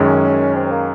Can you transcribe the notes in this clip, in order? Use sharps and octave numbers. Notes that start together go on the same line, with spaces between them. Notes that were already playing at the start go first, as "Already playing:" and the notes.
Already playing: F#2 D#3 G#3 C#4
C4
C4
A#3